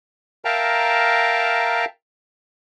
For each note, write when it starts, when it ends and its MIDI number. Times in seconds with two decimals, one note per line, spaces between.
0.45 1.85 70
0.45 1.85 76
0.45 1.85 77
0.45 1.85 79
0.45 1.85 81
0.45 1.85 82